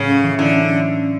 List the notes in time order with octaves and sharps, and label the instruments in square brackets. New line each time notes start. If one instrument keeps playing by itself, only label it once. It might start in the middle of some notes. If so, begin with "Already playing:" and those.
Already playing: [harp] A2 F#3 B3 C#4 [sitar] C#3
[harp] A3
E3
[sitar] D3 [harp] E4
[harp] C#4